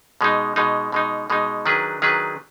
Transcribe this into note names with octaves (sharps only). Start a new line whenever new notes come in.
B2 G#3 D#4
B2 G#3 D#4
B2 G#3 D#4
B2 G#3 D#4
D#3 F#3 D4 G#4 B4
D#3 F#3 D4 G#4 B4